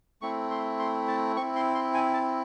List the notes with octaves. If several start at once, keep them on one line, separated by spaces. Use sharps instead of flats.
A3 C4 E4 C#6
C6
C6
A5
C4 E4 C#6
C6
C6
G#5
A5